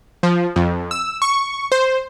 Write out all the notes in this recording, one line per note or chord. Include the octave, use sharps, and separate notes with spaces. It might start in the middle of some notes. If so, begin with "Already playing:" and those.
F3
F2
E6
C#6
C5